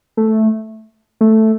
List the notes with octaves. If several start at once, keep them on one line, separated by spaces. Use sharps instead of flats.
A3
A3